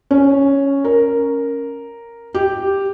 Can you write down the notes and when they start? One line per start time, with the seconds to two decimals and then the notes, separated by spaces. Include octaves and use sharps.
0.11 C#4
0.84 A#4
2.34 G4